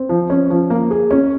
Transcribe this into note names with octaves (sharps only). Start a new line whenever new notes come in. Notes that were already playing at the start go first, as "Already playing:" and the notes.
Already playing: C4
F3
C#4
F3
A#3
G#4
C#4